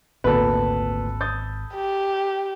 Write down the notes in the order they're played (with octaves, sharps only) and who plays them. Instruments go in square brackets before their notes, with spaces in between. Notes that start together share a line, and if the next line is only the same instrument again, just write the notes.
[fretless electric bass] G#1 D#3 C4 [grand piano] D2 A#2 B3 [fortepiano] A4 B4
[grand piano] D#6 G6 A6
[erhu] G4